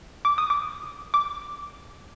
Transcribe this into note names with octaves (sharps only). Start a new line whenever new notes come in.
D6
D#6
D6
D6